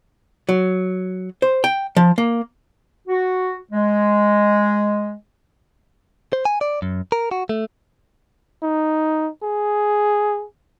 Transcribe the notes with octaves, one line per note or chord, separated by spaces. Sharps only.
F#3
C5
G5
F3
A#3
F#4
G#3
C5
G#5
D5
F#2
A#4
F#4
A3
D#4
G#4